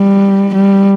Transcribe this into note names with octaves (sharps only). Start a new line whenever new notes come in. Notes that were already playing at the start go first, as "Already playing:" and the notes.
Already playing: G3
G3